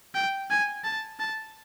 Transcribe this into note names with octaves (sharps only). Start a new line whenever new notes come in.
G5
G#5
A5
A5